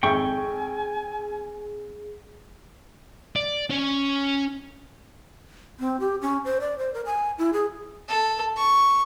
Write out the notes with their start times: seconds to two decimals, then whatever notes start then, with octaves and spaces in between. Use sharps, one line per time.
0.03 G#1 F2 G#4 E5 G5 G#5 C#6
3.36 D5
3.70 C#4 C#5
5.80 C4
6.00 G4
6.21 C#4
6.45 C5
6.60 D5
6.78 C5
6.94 A#4
7.06 G#5
7.38 E4
7.53 G#4
8.09 A4
8.56 C#6